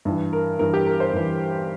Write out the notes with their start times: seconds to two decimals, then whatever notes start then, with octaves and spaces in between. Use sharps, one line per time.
0.05 G2 E3
0.33 A#4
0.59 G2 E3 A#4
0.74 G4
0.86 A#4
1.00 C5
1.13 G2 E3